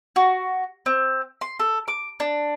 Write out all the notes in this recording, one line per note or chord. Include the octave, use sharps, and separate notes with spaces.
F#4
C4
C6
A4
D6
D4